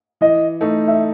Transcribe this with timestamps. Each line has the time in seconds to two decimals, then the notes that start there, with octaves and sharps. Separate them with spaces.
0.21 E3 D#5
0.61 A3 D#4
0.88 E5